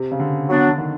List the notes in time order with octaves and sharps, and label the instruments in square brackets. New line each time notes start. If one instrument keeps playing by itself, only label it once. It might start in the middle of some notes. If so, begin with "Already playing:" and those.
Already playing: [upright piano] C3
C#3
D3
[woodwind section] F#3 B3 D4
[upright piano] D3
D#3